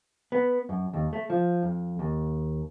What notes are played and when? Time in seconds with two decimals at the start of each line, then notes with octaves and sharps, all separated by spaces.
0.32 B3
0.69 F#2
0.93 D#2
1.13 A3
1.30 F3
1.63 F2
1.99 D#2